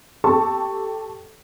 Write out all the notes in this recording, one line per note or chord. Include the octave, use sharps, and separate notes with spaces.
G4 A4 A5 C#6